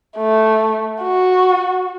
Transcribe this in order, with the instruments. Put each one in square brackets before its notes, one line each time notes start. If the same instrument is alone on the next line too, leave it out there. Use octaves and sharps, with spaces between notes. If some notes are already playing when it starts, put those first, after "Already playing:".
[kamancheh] A3
F#4